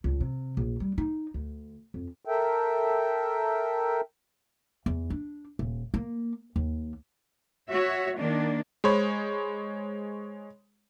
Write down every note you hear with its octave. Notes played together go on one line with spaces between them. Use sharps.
C#2
C3
A#1
G3
D#4
D2
F2
A4 A#4 E5 G5
E2
D4
D#1
A#3
D#2
F#4 C#5 E5
D#3 A#3 D4
G#3 C5 C#5 B5